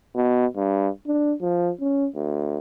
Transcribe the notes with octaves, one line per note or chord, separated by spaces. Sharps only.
B2
G2
D4
F3
C#4
D2